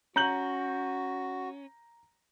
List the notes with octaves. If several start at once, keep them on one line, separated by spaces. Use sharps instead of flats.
C#4 F#4 A#5 G6 F#7